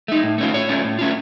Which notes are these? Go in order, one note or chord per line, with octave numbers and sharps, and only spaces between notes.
A3 D#4
A2
A3 C#4 F4
A2 C#5
A3 C#4 F4
A2
A3 C#4 F4